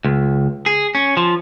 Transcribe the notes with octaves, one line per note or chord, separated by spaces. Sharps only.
C#2
G#4
C#4
F3